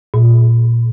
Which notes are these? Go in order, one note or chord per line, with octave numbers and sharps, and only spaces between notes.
A#2